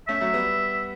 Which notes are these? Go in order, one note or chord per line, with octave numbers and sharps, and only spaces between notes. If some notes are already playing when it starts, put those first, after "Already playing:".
A3 C#4 E5
F#3 A3
G3 B3